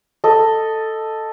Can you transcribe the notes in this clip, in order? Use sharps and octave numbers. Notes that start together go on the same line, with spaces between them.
A4 D#5